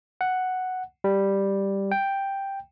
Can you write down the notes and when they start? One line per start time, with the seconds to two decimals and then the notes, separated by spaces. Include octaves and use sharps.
0.21 F#5
1.04 G3
1.92 G5